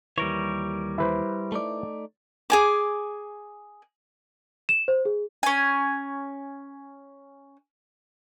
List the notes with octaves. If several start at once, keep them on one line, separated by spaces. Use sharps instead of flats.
D#2 E3 G3 A#4 C#5
E4 B4 C5
A3 D#4 D5
G#4 G#5 D6
E7
C5
G#4
C#4 G#5